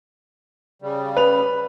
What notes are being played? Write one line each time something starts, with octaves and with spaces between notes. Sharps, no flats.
C#3 G3
B4 F7